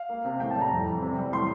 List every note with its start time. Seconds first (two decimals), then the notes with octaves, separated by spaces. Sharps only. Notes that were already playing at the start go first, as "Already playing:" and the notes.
Already playing: F5
0.09 A#3
0.25 C3
0.40 A2 G5
0.50 A5
0.56 G3
0.61 A#5
0.71 F2
0.86 E3
1.02 C3
1.18 G3
1.32 A2 C6